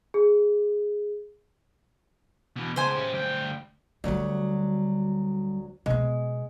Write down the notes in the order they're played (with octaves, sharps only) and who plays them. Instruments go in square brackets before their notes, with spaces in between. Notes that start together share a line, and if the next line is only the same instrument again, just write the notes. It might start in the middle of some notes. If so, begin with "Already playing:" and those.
[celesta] G#4
[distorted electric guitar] B2 E3
[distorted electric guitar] C#2 [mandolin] C5 G#5
[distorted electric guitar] C#4 G4
D2 G5
[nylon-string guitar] D2 F#3 [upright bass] D3 G3
[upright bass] B2 B3 [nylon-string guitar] G#3